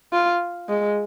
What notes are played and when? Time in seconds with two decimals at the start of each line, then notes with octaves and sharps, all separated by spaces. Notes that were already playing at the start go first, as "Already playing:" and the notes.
0.13 F4
0.69 G#3